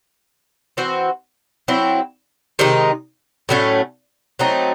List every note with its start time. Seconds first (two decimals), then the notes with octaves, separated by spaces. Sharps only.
0.77 E3 C4 F#4 C5
1.68 F#3 C4 E4
2.59 C3 D#3 G#3 D#4
3.49 A2 F#3 A3 C#4
4.39 F#3 A3 C4 D#4